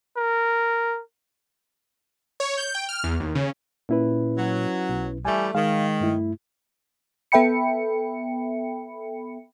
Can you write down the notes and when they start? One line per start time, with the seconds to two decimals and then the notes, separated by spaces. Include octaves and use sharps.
0.17 A#4
2.40 C#5
2.57 G6
2.75 G5
2.89 F6
3.04 E2
3.20 D#2
3.35 C#3
3.89 A#2 C#4 E4 B4
4.38 F#3
4.89 B1
5.25 E3 G3 A3 G#5
5.55 D#3 G#3 F5
6.00 G2 A3 E4
7.32 B3 A4 E5 G5 B5 C#7